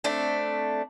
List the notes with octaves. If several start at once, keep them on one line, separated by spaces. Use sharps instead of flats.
A3 C4 D4